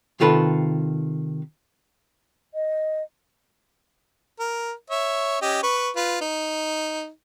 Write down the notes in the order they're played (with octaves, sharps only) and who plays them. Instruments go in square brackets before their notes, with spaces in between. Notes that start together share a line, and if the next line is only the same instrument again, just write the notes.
[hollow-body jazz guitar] C3 D#3 F4 A4 B4
[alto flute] D#5
[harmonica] A#4
C#5 E5
C#4 G4 D#5
B4 C#6
F4 B4
D#4